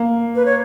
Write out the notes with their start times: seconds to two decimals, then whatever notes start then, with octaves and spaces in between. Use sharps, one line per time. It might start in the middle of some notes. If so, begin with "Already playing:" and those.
Already playing: A#3
0.35 B4
0.46 C#5